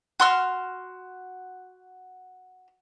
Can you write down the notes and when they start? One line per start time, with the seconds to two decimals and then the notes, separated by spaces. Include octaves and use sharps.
0.20 F#4 C6 F6